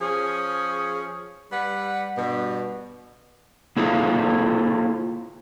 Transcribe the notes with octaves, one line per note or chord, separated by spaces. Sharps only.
F3 C#4 G#4
G3 B4 F#5
G2 B2
A#3 E4 F4 G#4 A4